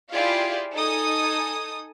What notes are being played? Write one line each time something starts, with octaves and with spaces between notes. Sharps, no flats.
E4 F4 G4 G#4 D5 F5
D#4 A4 G#5 D#6